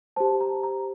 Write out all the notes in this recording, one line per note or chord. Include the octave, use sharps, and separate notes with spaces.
G4 C5 A5
A#5
A#5